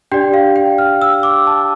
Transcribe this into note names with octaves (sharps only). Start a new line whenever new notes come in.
D4 G4 D5 G5
F5
G5
F6
E6
D6
A5